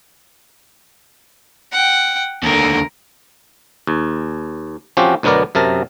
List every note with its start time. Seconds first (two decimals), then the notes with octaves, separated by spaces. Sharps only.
1.72 F#5 G5
2.43 D#2 D3 A#4
3.87 D#2
4.97 F3 C4 C#4 F#4 G4
5.23 D2 B2 F#3 B3 A#4 D5
5.55 F#2 C3 A#4 A5